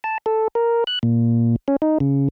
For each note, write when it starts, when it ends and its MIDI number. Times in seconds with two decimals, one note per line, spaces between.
0.04 0.18 81
0.26 0.48 69
0.55 0.84 70
0.87 0.99 90
1.03 1.56 46
1.68 1.76 61
1.82 1.98 63
2.00 2.28 49